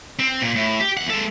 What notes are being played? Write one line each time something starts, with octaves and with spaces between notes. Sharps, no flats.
C4
A#2
A2
G4
E2 F#5
G#3 A4